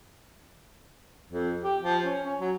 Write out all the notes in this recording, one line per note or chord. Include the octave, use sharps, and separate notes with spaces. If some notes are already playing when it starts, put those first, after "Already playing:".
F2
G4
F3
C#4
C#4
F#3